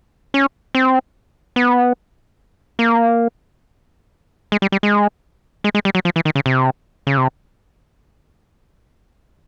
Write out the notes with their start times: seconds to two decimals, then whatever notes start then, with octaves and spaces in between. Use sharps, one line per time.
0.34 C#4
0.75 C4
1.56 B3
2.79 A#3
4.52 G#3
4.62 G3
4.72 G3
4.83 G#3
5.64 G#3
5.75 G#3
5.85 G3
5.95 F#3
6.05 F3
6.16 E3
6.25 D#3
6.35 C#3
6.46 C3
7.07 C#3
7.17 C3